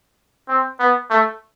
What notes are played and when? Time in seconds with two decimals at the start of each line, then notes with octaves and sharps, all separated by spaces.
0.49 C4
0.79 B3
1.10 A3